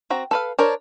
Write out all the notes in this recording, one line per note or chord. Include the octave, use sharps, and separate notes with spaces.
C4 F#4 A#5
A4 B4 F5
D4 A#4 C5 C#5